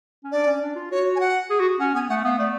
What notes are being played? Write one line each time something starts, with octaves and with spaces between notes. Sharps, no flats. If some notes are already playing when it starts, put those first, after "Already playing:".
C#4
D4 D5
C#4
D4
F4
F#4 C#5
G#5
F#5
G#4
F#4
C#4 F#5
B3 G#5
A3 F#5
B3 F5
A3 D5